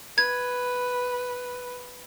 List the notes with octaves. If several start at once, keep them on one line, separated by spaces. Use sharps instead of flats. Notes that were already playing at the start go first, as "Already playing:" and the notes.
B4 G#6